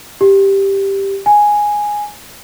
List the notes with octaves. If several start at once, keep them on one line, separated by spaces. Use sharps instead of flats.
G4
G#5